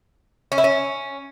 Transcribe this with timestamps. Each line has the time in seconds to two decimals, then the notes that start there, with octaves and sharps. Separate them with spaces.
0.52 C#4
0.58 E4
0.64 C#4